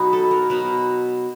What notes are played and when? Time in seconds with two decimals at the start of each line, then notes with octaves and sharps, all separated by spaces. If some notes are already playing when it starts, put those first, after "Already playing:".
Already playing: B2 F#3 B3 D#4
0.13 A4
0.31 A#4
0.49 B2 F#3 B3 D#4 A#4